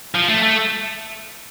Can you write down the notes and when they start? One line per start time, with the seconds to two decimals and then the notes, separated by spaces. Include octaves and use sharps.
0.15 F3
0.29 A3
0.42 A3